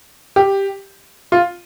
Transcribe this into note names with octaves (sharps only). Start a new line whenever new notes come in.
G4
F4